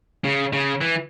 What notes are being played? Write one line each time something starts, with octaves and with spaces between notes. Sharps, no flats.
C#3
C#3
E3